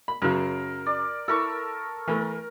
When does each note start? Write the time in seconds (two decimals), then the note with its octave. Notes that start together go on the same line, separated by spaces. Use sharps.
0.08 B5
0.22 F#2 C#3 A#4
0.86 D5
1.28 E4 A4 A#4 C#6
2.08 E3 A3 A#4